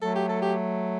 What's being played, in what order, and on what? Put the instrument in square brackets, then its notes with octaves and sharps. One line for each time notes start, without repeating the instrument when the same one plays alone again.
[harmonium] F#3 A3 [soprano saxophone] A4
[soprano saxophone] G4
A4
G4